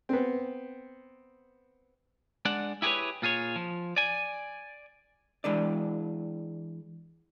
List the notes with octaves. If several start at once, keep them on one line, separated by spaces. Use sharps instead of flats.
B3 C4
G#3 D4 D5 F#5
E4 G4 G#4 A#4 B4 C#5
A#2 F4 G#4 C#5
F3
D5 G#5
E3 G#3 D4 D5